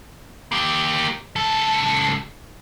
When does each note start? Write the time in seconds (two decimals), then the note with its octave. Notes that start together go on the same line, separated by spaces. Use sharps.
0.52 A#3 G4
1.36 C#2 A4